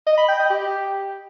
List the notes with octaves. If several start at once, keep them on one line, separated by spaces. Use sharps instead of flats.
D#5
B5
G5
D#5
G4